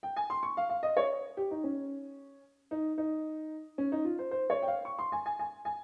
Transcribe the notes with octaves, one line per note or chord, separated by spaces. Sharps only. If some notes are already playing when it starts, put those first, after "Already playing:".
G5
G#5
C6
C#6
F5
F5
D#5
C#5
G4
D#4
C#4
D#4
D#4
C#4
D#4
F4
C5
C5
C#5
G5
F5
C#6
C6
G#5
G#5
G#5
G#5